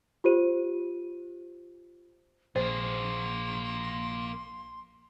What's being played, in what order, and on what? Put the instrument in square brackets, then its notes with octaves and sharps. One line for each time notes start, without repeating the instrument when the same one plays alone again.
[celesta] F4 G4 C5 D#7
[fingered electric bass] A#1 [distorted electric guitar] A#3 G#4 [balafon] C5 [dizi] C6